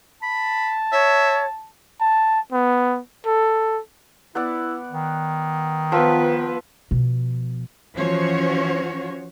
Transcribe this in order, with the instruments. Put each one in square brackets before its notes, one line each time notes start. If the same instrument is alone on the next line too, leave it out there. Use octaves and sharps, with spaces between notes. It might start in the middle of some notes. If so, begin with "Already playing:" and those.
[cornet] A5 [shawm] B5
[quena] C#5 [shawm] E5
[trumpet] A5
B3
A4
[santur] B3 D5 F#5 [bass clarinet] E4
[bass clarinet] D#3
[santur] F3 E6 [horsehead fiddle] B3 B4
[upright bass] B2 F3
[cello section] E3 F3 C#4 F#4 C5 C#5